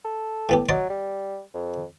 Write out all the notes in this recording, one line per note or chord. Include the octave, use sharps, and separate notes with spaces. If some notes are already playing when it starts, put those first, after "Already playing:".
A4
A2 B3 G4
F#3 D5 D#5 C6
G3
F2